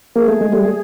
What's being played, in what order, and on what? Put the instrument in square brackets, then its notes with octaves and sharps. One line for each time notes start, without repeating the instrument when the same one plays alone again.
[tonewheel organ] A#3 [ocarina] G#4
[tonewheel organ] A3
G#3
G3 A3